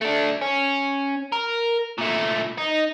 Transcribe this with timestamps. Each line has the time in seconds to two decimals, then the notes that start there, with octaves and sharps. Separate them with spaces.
0.02 A3 D4
0.41 C#4
1.32 A#4
1.98 A#2 A3
2.58 D#4